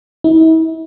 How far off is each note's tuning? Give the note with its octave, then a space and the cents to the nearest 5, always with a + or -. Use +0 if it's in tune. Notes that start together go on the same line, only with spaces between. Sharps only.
E4 -40